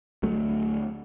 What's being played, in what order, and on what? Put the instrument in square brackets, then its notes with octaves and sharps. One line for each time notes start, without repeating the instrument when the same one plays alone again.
[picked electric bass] D2 F#3 A3